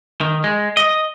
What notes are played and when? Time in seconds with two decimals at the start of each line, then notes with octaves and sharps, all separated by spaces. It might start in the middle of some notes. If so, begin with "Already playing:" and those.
0.21 D#3
0.44 G#3
0.77 D#5